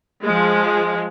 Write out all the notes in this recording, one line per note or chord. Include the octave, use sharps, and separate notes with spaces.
F3 G#3